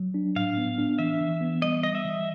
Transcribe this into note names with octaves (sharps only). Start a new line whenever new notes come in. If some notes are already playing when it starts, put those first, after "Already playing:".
Already playing: F#3
D4
A2 F5
B3
D4
E3 E5
E3
B3
G3 D#5
G3 D#5
E5
E3